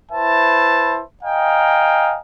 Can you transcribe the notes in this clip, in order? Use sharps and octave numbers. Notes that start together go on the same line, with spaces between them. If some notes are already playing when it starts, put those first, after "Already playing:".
E4 B4 C5 E5 A5
D#5 F5 G5 G#5 A#5